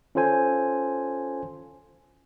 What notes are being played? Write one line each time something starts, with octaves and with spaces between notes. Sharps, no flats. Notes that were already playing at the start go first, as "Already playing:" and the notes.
C#4 F4 A4 C5 G#5